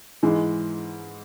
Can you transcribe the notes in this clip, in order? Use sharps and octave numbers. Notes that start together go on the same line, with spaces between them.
G#2 E3 G#3